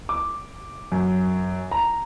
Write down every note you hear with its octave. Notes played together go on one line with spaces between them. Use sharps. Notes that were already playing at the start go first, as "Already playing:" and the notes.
D6
F#2
A#5